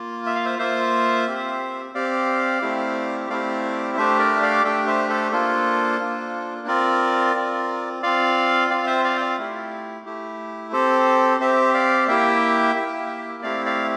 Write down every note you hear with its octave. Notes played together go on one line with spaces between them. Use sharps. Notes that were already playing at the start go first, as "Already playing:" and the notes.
Already playing: A#3 F4
E5
F5
C5 E5
A#3 F4 C5 E5
C4 G4
C4 G4 D5 F5
A3 C4 E4 G4
A3 C4 E4 G4 D5 F5
A3 D4 G4 C5 E5
A#4 D5
E5
D5 F5
A3 D4 G4 E5 G5
C5 E5
A4 C5
A#3 D4 F4 A4 C5
A#3 D4 F4
C4 F4 A#4 D5
C4 F4
C4 F4 D5 F5
C4 F4 D5 F5
C5 E5
D5 F5
G5
D5 F5
A3 E4 G4
A3 E4 G4
C4 G4 A4 C5
C4 G4 C5 E5
D5 F5
A#3 E4 G4 E5 G5
A#3 E4 G4
A3 C4 E4 G4 D5 F5
D5 F5